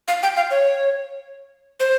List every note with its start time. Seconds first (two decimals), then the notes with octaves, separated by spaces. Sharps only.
0.08 F5
0.23 G5
0.37 F5
0.51 C#5
1.80 C5